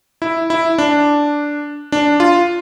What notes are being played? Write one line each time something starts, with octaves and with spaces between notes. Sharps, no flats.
E4
E4
D4
D4
F4